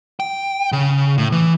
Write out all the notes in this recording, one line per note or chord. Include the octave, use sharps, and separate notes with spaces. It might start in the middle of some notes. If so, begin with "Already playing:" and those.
G5
C#3
A2
E3